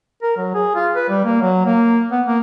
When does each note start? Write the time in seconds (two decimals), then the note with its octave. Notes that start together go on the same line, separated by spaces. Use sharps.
0.22 A#4
0.37 F#3
0.54 G#4
0.75 F4
0.95 B4
1.09 G3
1.24 A#3
1.41 F#3
1.66 A#3
2.11 B3
2.27 A#3